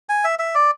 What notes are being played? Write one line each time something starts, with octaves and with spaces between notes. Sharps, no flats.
G#5
E5
E5
D5